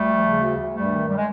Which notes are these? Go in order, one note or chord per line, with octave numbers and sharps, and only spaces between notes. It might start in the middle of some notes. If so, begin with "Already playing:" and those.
Already playing: D2 G3 A3
F3
C#3
D2
D2
G2 G3 A3
D#3
G3
G#3